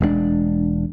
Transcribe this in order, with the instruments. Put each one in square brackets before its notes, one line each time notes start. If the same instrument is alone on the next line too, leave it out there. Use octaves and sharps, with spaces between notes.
[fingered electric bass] E1 G#3 A3 D4